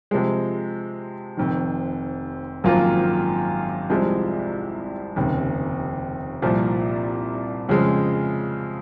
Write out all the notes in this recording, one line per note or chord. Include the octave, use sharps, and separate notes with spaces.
C3 F3 G#3
F1 F2 D#3
G#1 F#2 F3 A#3 F4
C2 C3 F3 G#3
F1 D#2 C#3
C2 A#2 F3
F2 C#3 F3 G#3